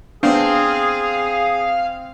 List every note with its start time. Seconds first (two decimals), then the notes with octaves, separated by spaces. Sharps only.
0.23 B3 C4 D4 G#4 F5